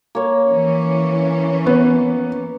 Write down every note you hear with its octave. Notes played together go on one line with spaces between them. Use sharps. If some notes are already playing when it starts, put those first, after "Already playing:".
A#3 C#5
E3 C#4
B3